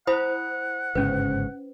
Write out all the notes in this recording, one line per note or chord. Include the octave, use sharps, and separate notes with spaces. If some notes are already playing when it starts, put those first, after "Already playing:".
E4 C5 F#5 B5 D#6
G1 G#2 C#3 C#4 B4